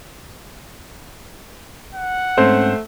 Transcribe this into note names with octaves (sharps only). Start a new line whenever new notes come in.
F#5
G#2 A3 C4 C#4 C5